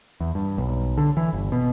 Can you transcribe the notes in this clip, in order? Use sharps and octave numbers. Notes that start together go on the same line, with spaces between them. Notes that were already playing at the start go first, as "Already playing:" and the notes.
E2
G2
B1
D3
E3
G1
B2